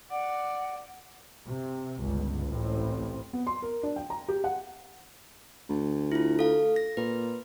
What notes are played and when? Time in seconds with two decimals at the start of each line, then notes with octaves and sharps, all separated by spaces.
0.11 D5 F#5
1.45 C3
2.01 G1 C#2
2.47 A1 A2 C4
3.33 B3
3.47 C6
3.62 A#4
3.83 D4
3.96 G5
4.10 A#5
4.28 G4
4.44 F#5
5.69 D2
6.12 E4 F4
6.39 A4 F5
6.76 A#6
6.97 A#2 B4